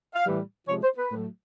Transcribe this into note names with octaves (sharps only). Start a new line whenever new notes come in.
F5
A2 E3 G3
C3 F3 G#3 C#5
C5
B4
A2 F#3 A3